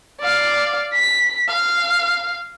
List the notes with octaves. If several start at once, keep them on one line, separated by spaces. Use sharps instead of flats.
D5 F5
B6
F5